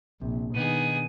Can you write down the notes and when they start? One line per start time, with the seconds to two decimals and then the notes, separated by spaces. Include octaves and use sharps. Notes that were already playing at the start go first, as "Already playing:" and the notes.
0.22 A#1 C3
0.54 B2 D#3 B3 D4 D#4 G#4 D#7